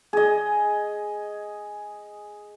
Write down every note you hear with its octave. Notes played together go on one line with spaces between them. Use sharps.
G#4 D#5